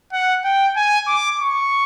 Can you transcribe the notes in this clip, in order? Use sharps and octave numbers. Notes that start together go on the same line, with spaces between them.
F#5
G5
G#5
D6
C#6